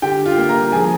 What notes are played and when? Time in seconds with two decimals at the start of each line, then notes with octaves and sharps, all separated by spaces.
0.02 D3 G4 G5
0.26 F4 F5
0.38 A#3
0.49 A#4 A#5
0.72 F3 G#4 G#5